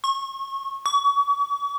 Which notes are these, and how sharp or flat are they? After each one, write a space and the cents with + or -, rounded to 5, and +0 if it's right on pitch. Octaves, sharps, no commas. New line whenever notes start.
C#6 -30
C#6 +40